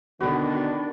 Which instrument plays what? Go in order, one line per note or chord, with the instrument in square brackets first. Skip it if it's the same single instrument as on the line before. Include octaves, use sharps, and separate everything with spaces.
[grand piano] B2 D3 [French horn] D#3 [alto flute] D4 [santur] F#4 B4